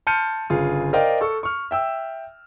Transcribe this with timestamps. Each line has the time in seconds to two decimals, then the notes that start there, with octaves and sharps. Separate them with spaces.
0.07 A5 C6 F6 G6 C#7 D#7
0.50 G1 C#3 F4 G#4
0.93 A#4 C5 D5 D#5 F5 G5
1.21 A4 C#6
1.43 C#6 F6
1.71 E5 G5 E6